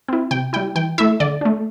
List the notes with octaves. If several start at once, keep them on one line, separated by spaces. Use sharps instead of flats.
C4 E4
C3 G5
G3 E4 G5
E3 G5
A3 E4 E5
D3 D5
A3 D4